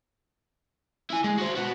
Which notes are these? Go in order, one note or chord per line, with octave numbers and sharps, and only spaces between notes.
E4 G#5
G#3
F#4 C5
B3 F#4